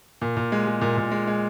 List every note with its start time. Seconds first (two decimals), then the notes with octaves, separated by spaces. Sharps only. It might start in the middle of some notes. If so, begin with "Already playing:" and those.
0.22 A#2
0.37 A#2
0.52 G#3
0.67 G#3
0.81 A#2
0.97 A#2
1.12 G#3
1.27 G#3